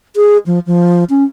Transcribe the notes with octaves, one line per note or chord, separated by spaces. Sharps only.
G#4
F3
F3
C#4